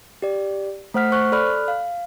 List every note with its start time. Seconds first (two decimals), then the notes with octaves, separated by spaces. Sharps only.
0.22 G4 D5
0.94 A3 C5 F#5 F6 B6
1.12 C5 C#6 F#6
1.32 A4 D5 B5 F6 F#6
1.68 F5